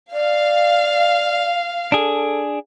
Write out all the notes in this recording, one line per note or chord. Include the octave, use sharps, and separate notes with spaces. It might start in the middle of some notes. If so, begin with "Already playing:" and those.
D5 F5
D4 G#4 A4